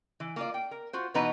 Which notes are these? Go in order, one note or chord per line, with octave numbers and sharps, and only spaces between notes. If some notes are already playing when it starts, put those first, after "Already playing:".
E3
A#3 F4 D5
G5
A#4
F4 F#4 C5
B2 E3 B3 D#4 B4 A#5